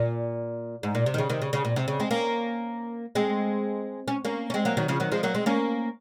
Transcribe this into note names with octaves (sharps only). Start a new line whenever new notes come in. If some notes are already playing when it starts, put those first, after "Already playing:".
Already playing: A#2
G#2
A#2
C3
D#3
C#3
C3 D#3
C#3
C#3
A#2
C3
C#3
G#3 C4
A#3 C#4
G#3 C4
C#4
A#3 C#4
C#4
G#3 C4
F#3 A#3
D#3 F#3
C#3 F3
D#3 F#3
F3 G#3
F#3 A#3
G#3 C4
A#3 C#4